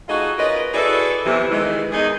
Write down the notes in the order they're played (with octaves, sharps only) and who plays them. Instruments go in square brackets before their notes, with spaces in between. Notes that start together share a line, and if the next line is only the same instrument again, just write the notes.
[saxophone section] A3 D#4 F4 F#4 G#4 D#5
C#4 F4 A#4 B4 D#5
E4 F#4 G#4 A4 B4 D5
E2 C3 E3
D#3 E3 G#3
E2 D#3 G#3 D#4 G#4